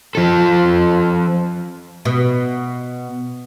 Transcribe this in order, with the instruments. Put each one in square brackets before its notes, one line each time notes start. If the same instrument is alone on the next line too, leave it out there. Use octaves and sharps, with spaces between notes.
[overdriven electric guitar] F3 A4
[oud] B2